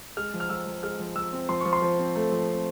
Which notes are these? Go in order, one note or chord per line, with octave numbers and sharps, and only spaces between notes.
G#3 F6
F3
F6
F3 E6
F3
G#3 F6
F3
F3 E6
C4
F3 C6
F3 C#6
C6
F3
C4
A3
F3
C4